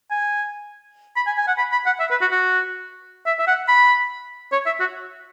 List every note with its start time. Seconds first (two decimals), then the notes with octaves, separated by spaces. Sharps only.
0.11 G#5
1.16 B5
1.27 G#5
1.37 G#5
1.48 F#5
1.58 B5
1.72 B5
1.86 F#5
2.00 E5
2.11 B4
2.21 F#4
2.32 F#4
3.26 E5
3.39 E5
3.48 F#5
3.68 B5
4.52 C#5
4.66 E5
4.80 F#4